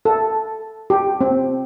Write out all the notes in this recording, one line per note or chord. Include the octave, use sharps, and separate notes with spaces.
A4
G4
C4